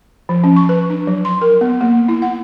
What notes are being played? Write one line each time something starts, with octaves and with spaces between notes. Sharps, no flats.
F3
C#4
C#6
B4
D4
F#3
C6
A#4
B3
A#3
E4
F#5